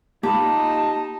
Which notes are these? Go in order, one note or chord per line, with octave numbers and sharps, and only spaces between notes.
A#3 D#4 F4 G4 A5 B5